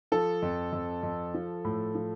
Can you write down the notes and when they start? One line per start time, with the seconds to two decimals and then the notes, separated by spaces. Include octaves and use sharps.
0.12 F3 A4
0.42 F2
0.72 F2
1.03 F2
1.34 F3
1.64 A2
1.95 F3